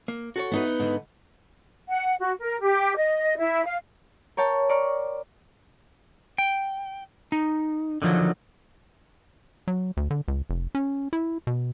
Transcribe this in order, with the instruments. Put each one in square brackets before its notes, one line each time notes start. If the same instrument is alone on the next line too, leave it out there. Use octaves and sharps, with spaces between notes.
[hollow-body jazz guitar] A#3
F#4 A4 C#5
[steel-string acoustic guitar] B3 D#4 B4
[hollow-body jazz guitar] G#2 D3
[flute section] F#5
F#4
A#4
G4
D#5
E4
F5
[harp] A#4 C#5 G5 A5
D5 A#5 C6 C#6 F6
[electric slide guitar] G5
D#4
D3 D#3 F3 F#3
[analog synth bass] F#3
D2
D3
C#2
F1
C#4
E4
B2